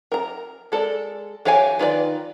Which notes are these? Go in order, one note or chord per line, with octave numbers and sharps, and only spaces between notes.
A#4 A#5
G#3 A4 A#4 D5
E3 G4 C#5 F5 G#5
D#3 F4 B4 D5